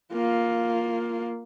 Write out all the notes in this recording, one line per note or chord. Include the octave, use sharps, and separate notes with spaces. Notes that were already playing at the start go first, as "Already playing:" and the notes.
A#3 F4